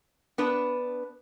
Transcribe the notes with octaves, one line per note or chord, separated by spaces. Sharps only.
B3 D4 B4